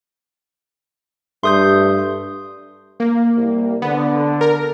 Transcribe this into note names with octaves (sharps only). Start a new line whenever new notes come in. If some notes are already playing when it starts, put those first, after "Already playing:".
G2 A3 C6 D#6 G6
A#3
C2
D3 B3
A#4